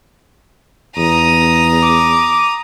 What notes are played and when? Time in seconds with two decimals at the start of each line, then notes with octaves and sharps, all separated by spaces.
0.97 E2 A#5 D#6
1.82 D6